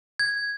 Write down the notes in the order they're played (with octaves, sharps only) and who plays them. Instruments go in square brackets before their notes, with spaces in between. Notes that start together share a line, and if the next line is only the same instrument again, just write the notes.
[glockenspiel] G#6